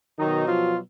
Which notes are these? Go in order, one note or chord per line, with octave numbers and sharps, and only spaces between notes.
B2 D#3 F#3 D#4
F3 F4